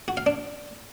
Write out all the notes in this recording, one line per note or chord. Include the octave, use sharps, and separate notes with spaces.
F#4
F5
D4